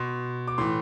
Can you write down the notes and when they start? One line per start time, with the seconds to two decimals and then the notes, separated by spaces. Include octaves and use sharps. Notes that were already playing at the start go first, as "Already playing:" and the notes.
Already playing: B2 C6
0.47 D6
0.58 A2 E3 C6